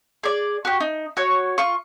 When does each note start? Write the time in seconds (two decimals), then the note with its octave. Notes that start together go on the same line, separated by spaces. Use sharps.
0.23 G#4 D5
0.65 F#4 G4
0.80 D#4
1.17 F#4 C#5
1.58 F4 C#6